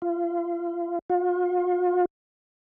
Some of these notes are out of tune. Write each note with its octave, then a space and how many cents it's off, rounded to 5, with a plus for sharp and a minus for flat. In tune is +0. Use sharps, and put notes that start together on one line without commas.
F4 -30
F4 +40